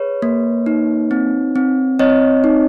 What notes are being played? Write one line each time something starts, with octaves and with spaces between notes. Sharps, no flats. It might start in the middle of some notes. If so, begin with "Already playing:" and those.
Already playing: G#4 B4 C#5
A#3
D#4
C4
C4
C4 C#5 D#5
D#4